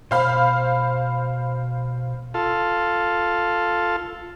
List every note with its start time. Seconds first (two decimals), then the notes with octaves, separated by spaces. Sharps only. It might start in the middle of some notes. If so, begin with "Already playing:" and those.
0.11 B2 C5 F5 B5
2.34 F4 A4